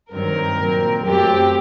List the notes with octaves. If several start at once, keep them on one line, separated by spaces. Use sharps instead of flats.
G2 D#3 F#3 C4 A#4
A#2 F#3 C4
F#2 F#3 A3 C4 G4